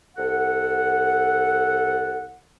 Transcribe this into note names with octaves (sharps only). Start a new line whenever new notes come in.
C2 A4 F#5